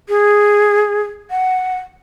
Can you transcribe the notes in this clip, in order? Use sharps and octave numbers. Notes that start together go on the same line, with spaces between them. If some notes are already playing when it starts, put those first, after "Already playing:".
G#4
F#5